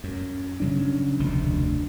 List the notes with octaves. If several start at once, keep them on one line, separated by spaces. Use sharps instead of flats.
F#2
C#3 F#3 D4
F1 D2 B2 D4